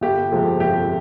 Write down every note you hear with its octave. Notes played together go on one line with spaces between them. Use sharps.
G1 G4
F2 C3 F3 G#3
G1 G4